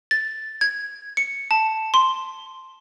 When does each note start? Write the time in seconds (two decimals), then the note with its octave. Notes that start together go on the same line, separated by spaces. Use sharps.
0.11 A6
0.61 G#6
1.17 C#7
1.51 A5
1.94 C6